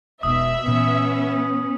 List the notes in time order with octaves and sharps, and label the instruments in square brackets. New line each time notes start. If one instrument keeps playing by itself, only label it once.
[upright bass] E1 D#4 [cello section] B2 [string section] E5 [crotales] D#6
[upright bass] A#2 E3 [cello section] B3 C#4